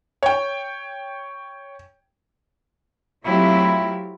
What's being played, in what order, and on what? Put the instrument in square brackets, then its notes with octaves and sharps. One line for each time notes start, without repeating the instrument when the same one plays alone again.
[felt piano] C#5 G5
[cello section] F#3 A3 C4 E4 F4 G4